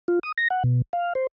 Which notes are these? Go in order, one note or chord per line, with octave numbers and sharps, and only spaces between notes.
F4
D#6
A#6
F#5
B2
F5
C5